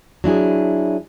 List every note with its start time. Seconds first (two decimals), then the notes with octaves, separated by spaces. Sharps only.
0.24 F#3 D4 E4 G#4